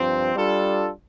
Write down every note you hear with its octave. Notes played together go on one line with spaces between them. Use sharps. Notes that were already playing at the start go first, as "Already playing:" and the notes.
Already playing: G2 F3 C4
G3 D4 F4 A4